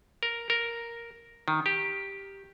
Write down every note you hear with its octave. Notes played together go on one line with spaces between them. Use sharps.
A#4
A#4
D#3
G4